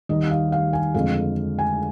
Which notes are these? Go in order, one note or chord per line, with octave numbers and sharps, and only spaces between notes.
D#2 D#3 G3 D#5
F5
F5
G#5
F2 D3 G#3 F5
G#5